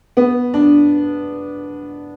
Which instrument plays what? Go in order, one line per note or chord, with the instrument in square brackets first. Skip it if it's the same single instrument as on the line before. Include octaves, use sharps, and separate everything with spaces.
[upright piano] B3
D4